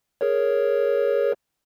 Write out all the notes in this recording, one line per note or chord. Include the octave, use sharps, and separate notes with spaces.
G#4 A#4 C#5